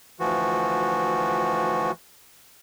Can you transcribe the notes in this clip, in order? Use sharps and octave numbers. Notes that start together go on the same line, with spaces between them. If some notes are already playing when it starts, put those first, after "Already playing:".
D2 E3 F3 F#4